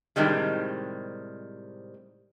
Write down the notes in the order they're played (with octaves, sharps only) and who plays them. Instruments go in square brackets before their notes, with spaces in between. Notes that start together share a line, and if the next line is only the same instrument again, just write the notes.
[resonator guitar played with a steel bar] A2 C3 D#3 G3 G#3